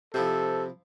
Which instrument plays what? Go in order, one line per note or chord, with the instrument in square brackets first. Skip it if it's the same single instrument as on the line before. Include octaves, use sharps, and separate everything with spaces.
[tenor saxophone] C3 [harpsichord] F3 E4 C5 [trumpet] A4